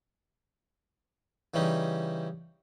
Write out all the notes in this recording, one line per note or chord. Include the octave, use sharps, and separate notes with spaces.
C#3 E3 G3 C#4 D#4